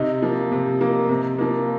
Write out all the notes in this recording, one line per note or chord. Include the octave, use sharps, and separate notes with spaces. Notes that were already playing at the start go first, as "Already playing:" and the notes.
Already playing: C3 D#4
F3 A#3
C3
F3 A#3
C3
F3 A#3